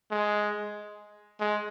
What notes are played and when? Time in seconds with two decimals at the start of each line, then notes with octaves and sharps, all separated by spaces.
0.11 G#3
1.40 G#3